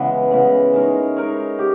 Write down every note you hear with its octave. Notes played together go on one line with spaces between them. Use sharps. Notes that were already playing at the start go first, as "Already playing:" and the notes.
Already playing: C#3 E3 G#3 B3
C#3 E3 G#3 B3
G#3 D#4 A#4 C#5
G#3 D#4 A#4 C#5
G4